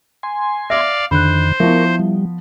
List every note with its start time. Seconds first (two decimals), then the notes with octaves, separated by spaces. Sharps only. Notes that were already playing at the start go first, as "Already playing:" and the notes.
0.23 G#5 C6
0.70 D5 E5 F5 A#6
1.11 F2 D3 D#3 C5 B5 F#6
1.60 F3 B3 E4 A#4 E5 C#6
1.99 G3